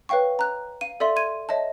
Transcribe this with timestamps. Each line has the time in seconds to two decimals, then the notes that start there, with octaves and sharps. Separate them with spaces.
0.09 B4 C#5 F5 G5 C#6
0.39 A#5 F#6
0.81 F5 D#7
1.00 A4 D5 E5 C6
1.16 C6 G#6 D#7
1.49 C#5 D#5 E5 A5